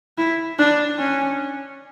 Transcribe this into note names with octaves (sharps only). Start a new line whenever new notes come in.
E4
D4
C#4